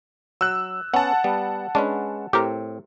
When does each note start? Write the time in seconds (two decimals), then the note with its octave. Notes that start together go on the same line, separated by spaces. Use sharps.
0.41 F#3 E6 F#6
0.94 B3 C#4 F#5 A5
1.24 G3 B3
1.75 G#3 C#4 D4 B4
2.33 A2 C4 G4 A#4